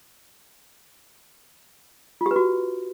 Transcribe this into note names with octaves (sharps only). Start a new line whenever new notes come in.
F4
G4
B4
F#4